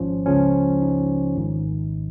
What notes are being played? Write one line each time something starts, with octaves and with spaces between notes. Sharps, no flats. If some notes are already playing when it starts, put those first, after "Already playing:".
Already playing: G#1 G#2 F3 C#4
C#2 C#3 F3 C#4
D#4
G#1 G#2 D#3